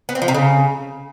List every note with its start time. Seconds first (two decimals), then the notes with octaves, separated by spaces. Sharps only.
0.09 B3
0.15 C4
0.22 F3
0.28 C3
0.34 C#3